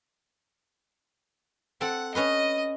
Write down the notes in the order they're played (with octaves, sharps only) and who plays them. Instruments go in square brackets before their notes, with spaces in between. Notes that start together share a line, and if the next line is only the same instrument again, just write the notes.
[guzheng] C4 A4 [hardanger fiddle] F#5
[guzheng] C#4 B4 C6 [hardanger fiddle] D#5 D#6